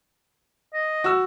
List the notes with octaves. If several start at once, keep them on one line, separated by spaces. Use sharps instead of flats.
D#5
F#4 E6